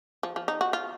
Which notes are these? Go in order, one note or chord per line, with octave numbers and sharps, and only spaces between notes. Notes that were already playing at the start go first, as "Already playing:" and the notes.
F3
F3
D#4
F#4
F4